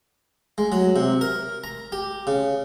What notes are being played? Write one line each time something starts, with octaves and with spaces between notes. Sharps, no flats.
G#3
F#3
C3
A#4
A#5
G4
C#3